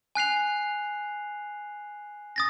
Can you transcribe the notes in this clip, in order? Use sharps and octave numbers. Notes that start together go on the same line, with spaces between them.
G#5 F#6 C7 F7
D#6 A6 A#6